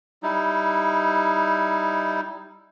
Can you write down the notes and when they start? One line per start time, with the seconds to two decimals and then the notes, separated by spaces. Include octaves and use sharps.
0.23 G3 D#4 E4